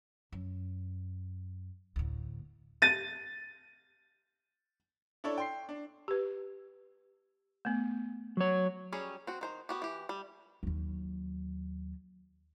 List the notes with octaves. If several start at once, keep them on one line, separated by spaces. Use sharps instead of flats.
F#2
D2 A2
A6 D#7
D4 E4 A4 C#5 D5
G5 C6 C7
D4
G4 B4
A3 B3
F#3 C#5
F#3 G3 C#4 G#4
C4 F#4
D#3 C5 A#5
B3 F#4 G4
E3 G4
G3
D#2 F#3